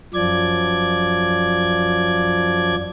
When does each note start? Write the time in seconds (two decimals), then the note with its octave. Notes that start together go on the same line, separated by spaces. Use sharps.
0.14 F#2 F3 D5 G#6